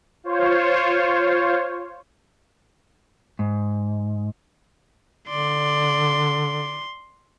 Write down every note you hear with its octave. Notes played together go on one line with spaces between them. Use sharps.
F4 C5 C#5
G#2
D3 D5 C6